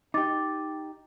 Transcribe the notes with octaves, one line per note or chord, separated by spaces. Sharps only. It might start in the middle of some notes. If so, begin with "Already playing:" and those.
D#4 G4 D6 A6